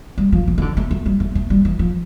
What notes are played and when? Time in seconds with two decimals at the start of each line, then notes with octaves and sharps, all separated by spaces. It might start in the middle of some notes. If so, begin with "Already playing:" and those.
0.18 G3
0.32 F3
0.47 E3
0.58 E3
0.62 D3
0.77 A3
0.91 A3
1.06 G3
1.20 A3
1.35 A3
1.50 G3
1.65 E3
1.79 F3